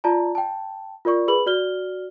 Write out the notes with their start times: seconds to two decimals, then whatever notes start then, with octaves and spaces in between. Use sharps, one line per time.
0.04 F4 D5 A5 A#5
0.35 G5 A5
1.05 F4 A#4 D5 C#6
1.28 G#4 B4 B5 F#7
1.46 F#4 D5 F6 G7